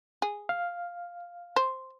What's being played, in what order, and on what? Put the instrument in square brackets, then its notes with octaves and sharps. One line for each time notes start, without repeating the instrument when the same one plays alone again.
[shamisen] G#4
[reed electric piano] F5
[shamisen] C5